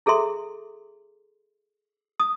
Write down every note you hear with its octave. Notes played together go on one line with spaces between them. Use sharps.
E4 G#4 A4 E5 C6
D#6